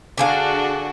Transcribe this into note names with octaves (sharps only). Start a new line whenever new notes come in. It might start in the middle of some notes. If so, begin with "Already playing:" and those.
D3 D4 F#4 G#4 F5